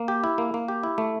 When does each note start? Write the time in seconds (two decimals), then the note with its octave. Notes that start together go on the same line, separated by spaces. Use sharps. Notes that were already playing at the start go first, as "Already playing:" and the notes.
Already playing: A#3
0.08 G4
0.24 E4
0.38 A#3
0.54 A#3
0.68 G4
0.83 E4
0.98 A3